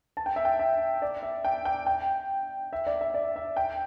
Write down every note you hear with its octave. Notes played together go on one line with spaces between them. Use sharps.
A5
G5
E5
G5
E5
D5
E5
G5
G5
G5
E5
D5
E5
D5
E5
G5